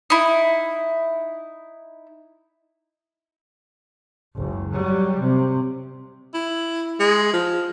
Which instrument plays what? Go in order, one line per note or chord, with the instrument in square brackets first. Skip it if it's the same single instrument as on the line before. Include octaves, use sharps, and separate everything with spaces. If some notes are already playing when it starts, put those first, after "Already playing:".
[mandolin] D#4 E4
[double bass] F#1 C#2
F#3 G3
C3
[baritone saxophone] E4
G#3
F3